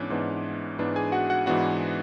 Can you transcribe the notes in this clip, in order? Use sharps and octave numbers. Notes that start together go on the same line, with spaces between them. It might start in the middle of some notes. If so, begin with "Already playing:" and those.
Already playing: G#2 E3 B3 C#4 D4 C#5
G#2 E3 B3 D4
G#2 E3 B3 D4
G#4 G#5
F#4 F#5
F#4 F#5
G#2 E3 B3 D4 F#4 F#5